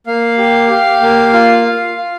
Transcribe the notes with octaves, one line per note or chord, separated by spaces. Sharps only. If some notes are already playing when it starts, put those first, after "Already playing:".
A#3 F5
G4
G4
A#3
F4
F4
F4